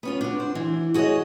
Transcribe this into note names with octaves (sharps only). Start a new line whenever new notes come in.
B3 C#4 F4
D4 F#4
C5
E3
F#4 G#4 A#4 C#5 D#5